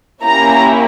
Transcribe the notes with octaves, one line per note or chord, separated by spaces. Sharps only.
A#3 C#4 E4 G4 A#5